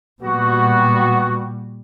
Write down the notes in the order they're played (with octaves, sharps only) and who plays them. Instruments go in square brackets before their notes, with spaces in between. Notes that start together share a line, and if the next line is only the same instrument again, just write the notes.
[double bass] A#2 G3 [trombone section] B3 F#4